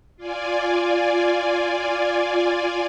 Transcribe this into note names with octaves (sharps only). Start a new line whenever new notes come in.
F4 D5 G#5